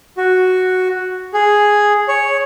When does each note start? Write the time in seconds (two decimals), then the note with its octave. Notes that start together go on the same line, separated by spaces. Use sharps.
0.17 F#4
1.34 G#4
2.08 C#5